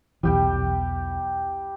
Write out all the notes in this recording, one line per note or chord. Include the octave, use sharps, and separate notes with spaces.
B1 E2 E3 G3 G4 G5